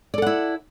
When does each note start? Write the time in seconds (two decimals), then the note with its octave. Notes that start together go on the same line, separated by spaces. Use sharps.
0.14 D5
0.18 A4
0.22 F#5
0.26 E4